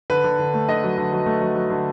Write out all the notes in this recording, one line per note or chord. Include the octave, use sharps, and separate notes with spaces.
D3 B4
D3
D3
A3
D3 D#5
F#3
D3
F#3
A3
F#3
F#3
D3